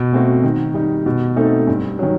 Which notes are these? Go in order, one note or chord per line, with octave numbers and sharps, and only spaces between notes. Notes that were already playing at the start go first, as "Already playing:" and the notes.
Already playing: B2
A3 C4 F#4
D#3
G3 D#4
B2
A3 C4 D#4 A4
G2
D#3 F#3